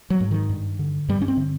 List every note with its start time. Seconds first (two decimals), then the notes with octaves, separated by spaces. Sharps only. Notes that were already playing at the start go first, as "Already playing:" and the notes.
0.10 F#3
0.20 G#2
0.31 D#3
0.49 G2
0.79 D3
1.08 G2 G3
1.21 C#4
1.28 C4
1.37 D3